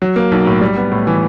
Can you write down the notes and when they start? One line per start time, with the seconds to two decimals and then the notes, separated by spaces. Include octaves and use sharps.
0.02 F#3
0.16 A#3
0.32 B1
0.46 A2
0.61 G3
0.77 B3
0.92 A2
1.07 E3